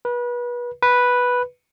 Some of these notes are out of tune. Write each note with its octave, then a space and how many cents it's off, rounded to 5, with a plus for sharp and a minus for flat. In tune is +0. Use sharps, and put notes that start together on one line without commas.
B4 -30
B4 -5